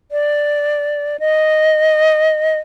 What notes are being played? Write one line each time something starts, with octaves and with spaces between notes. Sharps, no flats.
D5
D#5